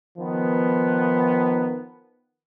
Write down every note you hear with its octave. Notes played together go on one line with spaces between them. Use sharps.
D#3 F3 B3